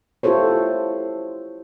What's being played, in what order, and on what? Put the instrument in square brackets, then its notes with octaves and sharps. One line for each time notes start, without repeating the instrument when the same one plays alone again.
[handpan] E4 F4 G4 A4 C5 C#5